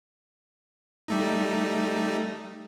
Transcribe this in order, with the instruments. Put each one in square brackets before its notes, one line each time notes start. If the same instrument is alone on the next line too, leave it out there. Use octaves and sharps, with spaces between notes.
[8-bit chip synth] G3 A3 D#4